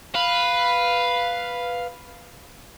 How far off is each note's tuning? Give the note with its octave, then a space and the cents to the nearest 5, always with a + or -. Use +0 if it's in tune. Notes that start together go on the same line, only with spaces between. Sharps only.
B4 +0 F5 +0